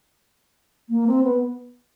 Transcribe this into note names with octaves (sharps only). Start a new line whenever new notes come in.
A#3
C4
B3